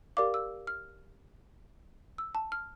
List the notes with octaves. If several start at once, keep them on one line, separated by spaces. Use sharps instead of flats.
G4 A#4 D5 F5 D6
E6
F6
E6
A5
F6